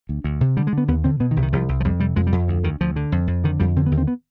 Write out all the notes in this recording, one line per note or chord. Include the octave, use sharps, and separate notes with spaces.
D2
D2
C3
D3 G3
G#3
D3 B3
D#2 B3
D3 C4
B2 B3
D#3
C2
D#3
C2 F3
C2
F3
F2 G3
C3 G3
F2 G#3
G3
F2
D2
D2 D#3
D2 F3
D3
F2
F2
D3 D#3
F2 G3
D3 C4
B3
D#2
C4
B3